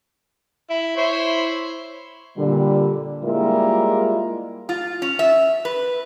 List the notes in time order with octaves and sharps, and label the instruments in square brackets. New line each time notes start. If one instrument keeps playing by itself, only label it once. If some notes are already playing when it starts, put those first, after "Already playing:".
[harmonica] E4
E4 C5 C#5
[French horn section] A#2 D3 G3
G3 G#3 A#3 E4 F4 A#4
[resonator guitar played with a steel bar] F4
C#4
E5
B4